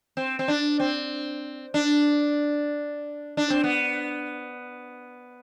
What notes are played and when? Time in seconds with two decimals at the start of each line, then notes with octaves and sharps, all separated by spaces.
0.17 C4
0.39 C4
0.48 D4
0.80 C4
1.74 D4
3.37 D4
3.50 C4
3.64 B3